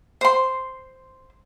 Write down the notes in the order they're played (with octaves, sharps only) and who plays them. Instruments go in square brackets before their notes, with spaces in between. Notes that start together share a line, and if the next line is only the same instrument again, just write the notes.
[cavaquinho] C5 C6